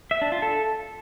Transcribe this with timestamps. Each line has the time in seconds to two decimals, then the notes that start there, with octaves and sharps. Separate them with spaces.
0.11 E5
0.22 D4
0.32 F4
0.42 A4